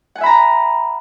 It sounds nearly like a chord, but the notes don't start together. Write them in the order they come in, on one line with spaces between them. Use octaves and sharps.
F#5 G#5 E5 B5 A#5